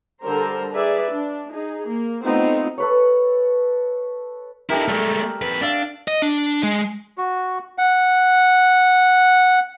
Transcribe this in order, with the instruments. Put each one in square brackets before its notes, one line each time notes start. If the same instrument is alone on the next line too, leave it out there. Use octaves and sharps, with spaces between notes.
[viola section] D3 G3 A4 A#4 C5 A#5
G#4 B4 D5 E5
D4
D#4 G#4
A#3
A3 B3 C4 D#4 F4
[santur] A4 B4 C#5
[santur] A3 G4 A#4 [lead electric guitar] D#4 E4
[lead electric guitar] G#3 A3 [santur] D5 E6
[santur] D5
[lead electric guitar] F2 B4
[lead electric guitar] D4 [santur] E5 F5
[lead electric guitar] D#5
D4
G#3
[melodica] F#4
F#5